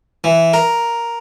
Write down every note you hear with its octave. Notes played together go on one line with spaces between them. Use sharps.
E3
A#4